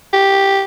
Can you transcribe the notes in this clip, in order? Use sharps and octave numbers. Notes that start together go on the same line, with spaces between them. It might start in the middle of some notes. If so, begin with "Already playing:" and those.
G4